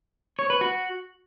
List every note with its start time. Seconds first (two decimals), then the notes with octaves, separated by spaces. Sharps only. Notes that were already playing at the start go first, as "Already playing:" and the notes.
0.39 C#5
0.50 B4
0.61 F#4